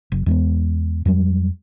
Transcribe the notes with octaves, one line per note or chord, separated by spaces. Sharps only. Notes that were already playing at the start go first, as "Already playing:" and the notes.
F#1
E2 G#3 B3
F2 F#3 G3